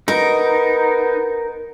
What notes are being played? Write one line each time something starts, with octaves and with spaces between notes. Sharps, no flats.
B3 D#4 A#4